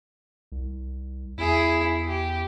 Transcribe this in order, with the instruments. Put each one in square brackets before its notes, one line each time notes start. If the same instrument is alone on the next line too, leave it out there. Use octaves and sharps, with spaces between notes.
[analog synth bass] C2
[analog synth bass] E2 [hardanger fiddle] E4 G#4
[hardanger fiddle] G4